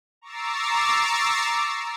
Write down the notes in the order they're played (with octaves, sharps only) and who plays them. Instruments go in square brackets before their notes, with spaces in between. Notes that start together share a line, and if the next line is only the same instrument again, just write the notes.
[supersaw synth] A#5 C#6 D6 E6 A6 C7